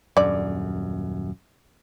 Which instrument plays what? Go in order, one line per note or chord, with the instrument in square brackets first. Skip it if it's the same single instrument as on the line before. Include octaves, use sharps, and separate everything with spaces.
[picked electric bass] D#1 F#2 [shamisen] D3 D5